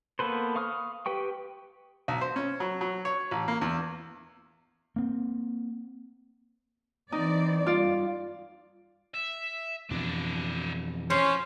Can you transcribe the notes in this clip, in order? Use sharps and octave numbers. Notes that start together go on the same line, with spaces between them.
A#3 B3 A4 B4 C5
F5 C#6 D#6 F6
G4 B4 G5 C#6
B1
C5
C#4
F#3
F#3
C#5
A1
A#3
E2
A#3 C4
E3 C4 D#4 D5
G2 F4 D5
E5
F2 B2 E3 D4 E4
F3 C#4 C5 C6